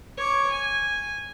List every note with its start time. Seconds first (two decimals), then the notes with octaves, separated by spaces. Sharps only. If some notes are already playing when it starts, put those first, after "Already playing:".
0.17 C#5 D6
0.50 G#5